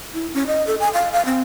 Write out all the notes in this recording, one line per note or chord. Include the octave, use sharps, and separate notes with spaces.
E4
C#4
D#5
A4
G#5
F5
F5
C4